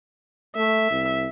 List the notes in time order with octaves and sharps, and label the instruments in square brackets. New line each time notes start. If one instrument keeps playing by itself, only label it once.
[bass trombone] A3 [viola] E5
[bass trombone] C2